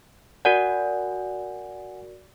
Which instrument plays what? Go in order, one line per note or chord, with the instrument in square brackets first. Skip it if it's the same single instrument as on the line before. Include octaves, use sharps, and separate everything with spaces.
[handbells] F#4 A#4 D5 [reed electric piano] F#5 G#5